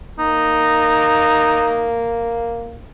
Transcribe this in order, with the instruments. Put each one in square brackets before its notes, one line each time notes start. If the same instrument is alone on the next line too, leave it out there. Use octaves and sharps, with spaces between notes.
[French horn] A#3 [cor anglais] D#4